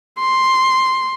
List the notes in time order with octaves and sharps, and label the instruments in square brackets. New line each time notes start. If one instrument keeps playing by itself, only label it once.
[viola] C6